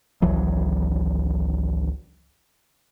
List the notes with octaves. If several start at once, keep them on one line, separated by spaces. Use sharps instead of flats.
G#1 C#2 E3 F#3